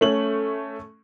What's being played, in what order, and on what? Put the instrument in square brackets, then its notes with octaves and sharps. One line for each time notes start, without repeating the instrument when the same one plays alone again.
[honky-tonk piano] A3 C#4 F#7